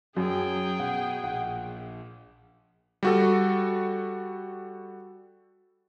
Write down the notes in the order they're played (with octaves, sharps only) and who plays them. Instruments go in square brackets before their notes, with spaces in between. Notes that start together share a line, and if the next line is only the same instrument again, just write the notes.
[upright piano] F#2 [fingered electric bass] F#3 [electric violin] G#4 G5
[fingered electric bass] B2 [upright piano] F#5
[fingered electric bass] A#1 [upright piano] F#5
[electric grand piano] G3 F#4 A4